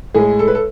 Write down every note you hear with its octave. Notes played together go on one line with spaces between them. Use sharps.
A2 G#3 G#4
A4
B4
A4